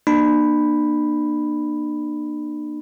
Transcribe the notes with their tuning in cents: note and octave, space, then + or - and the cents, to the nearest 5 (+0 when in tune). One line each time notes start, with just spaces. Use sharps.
A#3 +20 D4 +40 B5 +0